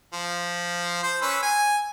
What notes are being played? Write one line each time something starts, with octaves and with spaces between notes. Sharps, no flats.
F3
C5
C#4 B4 E6
G#5